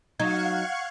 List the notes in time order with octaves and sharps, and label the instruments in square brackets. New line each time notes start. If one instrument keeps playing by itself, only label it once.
[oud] F#3 D#4 [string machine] F5 F#5 C#6 [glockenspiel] G#6